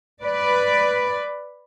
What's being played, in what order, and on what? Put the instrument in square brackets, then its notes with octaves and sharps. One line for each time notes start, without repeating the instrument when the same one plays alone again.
[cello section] B4 D5